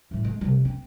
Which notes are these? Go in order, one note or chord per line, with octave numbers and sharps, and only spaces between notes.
A2 G3
D3 G#3
C3 G3
C4